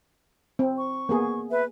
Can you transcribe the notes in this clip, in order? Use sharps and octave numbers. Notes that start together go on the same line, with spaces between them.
C4
C#6
A#3 B3 G#4
B4 E5